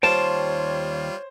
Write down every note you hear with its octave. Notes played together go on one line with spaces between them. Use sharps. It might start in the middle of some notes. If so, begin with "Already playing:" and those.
D#2 G3 F4 C5 C#5 G5 A5